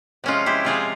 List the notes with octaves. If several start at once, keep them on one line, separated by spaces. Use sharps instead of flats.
C3 F3 G#3 C#4 F4
E4 G4
C3 F3 G#3 F4 G#4